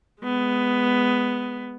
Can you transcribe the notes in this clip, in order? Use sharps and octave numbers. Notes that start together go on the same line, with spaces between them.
G#3 B3